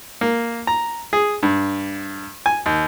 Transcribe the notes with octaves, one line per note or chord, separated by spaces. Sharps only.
A#3
A#5
G#4
G2
G#5
D#2